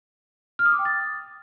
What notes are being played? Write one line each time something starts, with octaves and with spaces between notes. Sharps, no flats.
F6
D#6
D6
G5
A6